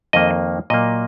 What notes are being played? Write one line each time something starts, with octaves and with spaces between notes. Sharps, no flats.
F2 D#3 A#3 D#5
A#2 F#3 A#3 D#5